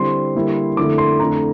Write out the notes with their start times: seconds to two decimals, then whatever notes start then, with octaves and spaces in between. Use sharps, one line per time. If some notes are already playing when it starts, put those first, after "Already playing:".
Already playing: D3 G3 C4 E4 C6
0.35 D3 G3 A#3 E4
0.77 F2 D3 A3 E4 D6
0.98 C6
1.19 F2 D3 A3 E4 A#5